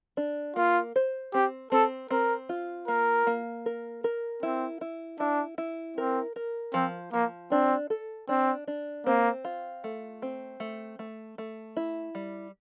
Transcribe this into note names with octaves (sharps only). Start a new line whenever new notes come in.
D4
A#3 F4
C5
C4 G4
C4 A4
C4 A#4
F4
A#3 A#4
A#3
A#4
A#4
C4 E4
E4
D4 E4
E4
C4 A#4
A#4
F3 C4
F3 A#3
C4 D4
A4
C4 D4
D4
A#3 C4
F4
A3
C4
A3
A3
A3
E4
G3